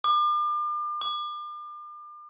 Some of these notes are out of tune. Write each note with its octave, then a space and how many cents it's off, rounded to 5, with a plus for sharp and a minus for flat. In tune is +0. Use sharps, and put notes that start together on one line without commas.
D6 +40
D6 +40